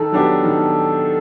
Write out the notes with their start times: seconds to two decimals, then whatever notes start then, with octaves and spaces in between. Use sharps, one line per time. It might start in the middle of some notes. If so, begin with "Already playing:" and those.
Already playing: D#3 A4
0.12 F#3 B3 D4 G4
0.43 D#3